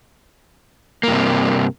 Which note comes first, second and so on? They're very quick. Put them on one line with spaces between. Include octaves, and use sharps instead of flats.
A#3 G2 C3